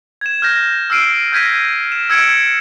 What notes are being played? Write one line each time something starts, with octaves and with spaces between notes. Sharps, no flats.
G#6 E7
F6 G6 A#6
E6 F6 C7 D7 D#7
F6 G6 G#6 A#6 B6 D#7
E7
E6 G#6 C#7 D7 E7